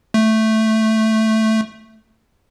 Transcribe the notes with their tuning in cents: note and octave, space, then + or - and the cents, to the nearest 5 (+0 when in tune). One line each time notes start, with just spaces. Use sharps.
A3 +0